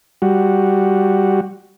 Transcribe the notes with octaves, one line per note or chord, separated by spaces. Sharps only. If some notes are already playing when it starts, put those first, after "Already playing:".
G3 F#4